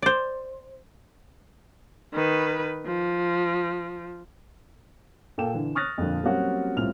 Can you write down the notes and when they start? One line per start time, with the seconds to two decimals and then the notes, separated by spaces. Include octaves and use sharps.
0.02 C5 D5
2.14 D#3 B4
2.86 F3
5.38 A#2 A4 G5 E7
5.54 D3 E3
5.75 C#6 D#6 F6 F#6 A6 A#6
5.98 F2 A#2 D3 F3
6.23 F#3 G3 A#3 C4 C#4 F#4
6.77 C2 A2 C4 F4 F6 F7